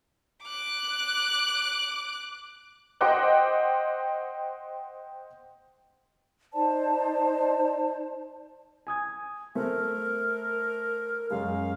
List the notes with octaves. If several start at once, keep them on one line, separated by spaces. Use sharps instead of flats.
D6 F#6
C5 D#5 F#5 G5 D6 F#6
D#4 C5 D5 A5
G#5 D#6 G#6
A3 A#4 C5
F#2 G#3 F5